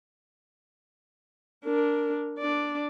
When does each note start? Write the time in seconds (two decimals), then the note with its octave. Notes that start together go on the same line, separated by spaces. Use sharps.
1.64 D4 A#4
2.38 D4 D5